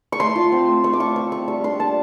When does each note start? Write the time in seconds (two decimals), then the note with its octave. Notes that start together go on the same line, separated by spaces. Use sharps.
0.12 C#6
0.20 A3 C6
0.35 F4
0.52 C4
0.68 A3
0.84 A3 C#6
0.93 D6
1.00 F4 C#6
1.16 C4 C#6
1.32 A3 C#6
1.48 G3 C#6
1.64 D4 C6
1.79 A#3 A5